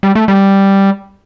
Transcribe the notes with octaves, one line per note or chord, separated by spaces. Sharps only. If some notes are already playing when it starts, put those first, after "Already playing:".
G3
A3
G3